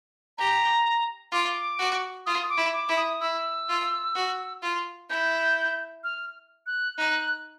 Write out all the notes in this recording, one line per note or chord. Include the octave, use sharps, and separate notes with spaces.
G4 A#5
F4 D6
F#4
F4 D#6
D6
E4
D6
E4
D#6
E4 E6
F4
F#4
F4
E4 G6
F6
F#6
D#4 F#6